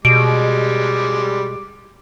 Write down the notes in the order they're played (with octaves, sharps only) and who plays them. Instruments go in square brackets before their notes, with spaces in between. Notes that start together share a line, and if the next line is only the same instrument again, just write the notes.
[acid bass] B2 [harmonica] G3 G#3 D6 [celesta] D7